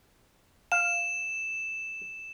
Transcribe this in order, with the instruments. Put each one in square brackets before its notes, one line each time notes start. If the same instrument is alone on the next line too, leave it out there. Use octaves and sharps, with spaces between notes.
[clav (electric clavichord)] F5 [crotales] E7